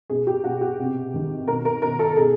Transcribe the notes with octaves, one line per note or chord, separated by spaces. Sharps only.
B2 G#4
G4
B2 F#4
G4
C3
D#3
B2 A#4
A#4
B2 A#4
A4
B2 G#4